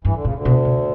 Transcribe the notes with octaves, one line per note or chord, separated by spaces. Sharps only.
G2 E3
D3
A#2 C#3
D2 D3
B2
B2